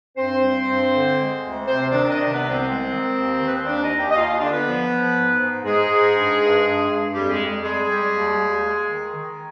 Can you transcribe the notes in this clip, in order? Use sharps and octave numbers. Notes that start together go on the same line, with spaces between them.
G2 C4 C5
G3
G2
D3
G#3
D2
C3 C4 C5
C5
D#3 D4 D5
D#5
C3 D4 D5
B3 B4
C2
C4 C5
G#3
D#3
D#2
D#3
B4
C5
D#2 D4 D5
D#4 D#5
D#2
G4 G5
D#5
D#2 F4 F5
F4 F5
D3 D4 D5
B3 B4
F3
F3
G#2
G#2
G#2 G#3 G#4
G#2
G2
G2
G2
G2
F2 G3 G4
G#3 G#4
F2
G3 G#3 G#4
G3
D#2
D#2
G#3
D#3
D#3